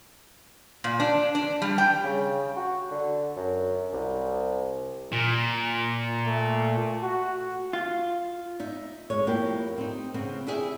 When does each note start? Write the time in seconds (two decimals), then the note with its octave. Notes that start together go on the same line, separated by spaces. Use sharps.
0.84 A#2
1.00 D4
1.35 D4
1.62 G3
1.78 G5
2.04 C#3
2.57 F#4
2.91 D3
3.36 F#2
3.93 C2
5.12 A#2
6.27 A3
7.03 F#4
7.73 F4
8.60 D#4 E5
9.10 G#3 C#5
9.27 F2 A#3 E4 G4
9.78 C4 D#4
10.14 C#3 B3 C4
10.47 E4 G4 G#4 E5